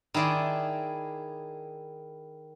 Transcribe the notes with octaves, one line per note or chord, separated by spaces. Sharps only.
D#3 E4 G#4 D5 C6